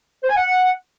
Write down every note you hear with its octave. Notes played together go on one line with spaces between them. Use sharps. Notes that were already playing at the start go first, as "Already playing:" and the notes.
C5
G#5
F#5